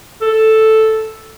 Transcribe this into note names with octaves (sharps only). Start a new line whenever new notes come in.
A4